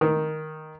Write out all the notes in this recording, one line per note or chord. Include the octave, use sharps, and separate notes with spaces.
D#3